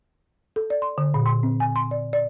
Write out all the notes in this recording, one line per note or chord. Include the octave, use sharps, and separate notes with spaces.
A4
D5
C6
D3
A#2
C6
C4
G#5
C6
D5
D5